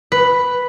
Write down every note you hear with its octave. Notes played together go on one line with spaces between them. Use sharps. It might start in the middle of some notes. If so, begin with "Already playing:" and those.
B4